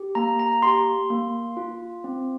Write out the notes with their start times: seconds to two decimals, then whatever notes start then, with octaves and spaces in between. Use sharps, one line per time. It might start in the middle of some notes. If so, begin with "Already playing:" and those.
Already playing: G4
0.15 A#3 A#5
0.39 A#5
0.62 G4 C6
1.10 A#3
1.57 F4
2.04 C4